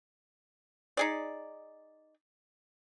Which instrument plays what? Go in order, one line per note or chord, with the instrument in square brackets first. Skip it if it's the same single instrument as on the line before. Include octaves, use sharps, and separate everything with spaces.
[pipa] D#4 G#4 D5